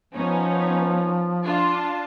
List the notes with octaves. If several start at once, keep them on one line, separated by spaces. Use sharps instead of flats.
F3 B3 C#4 D#4
D4 F4 A5